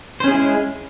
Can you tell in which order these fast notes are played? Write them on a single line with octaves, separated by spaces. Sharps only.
C5 C#4 G#4 E4 G#3